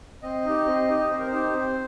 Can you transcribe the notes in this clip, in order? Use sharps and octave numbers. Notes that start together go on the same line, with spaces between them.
C4 D#5
D#4 G4
C4
D#4 G4
C4 C5
A#4
C5
D#4 G4
C4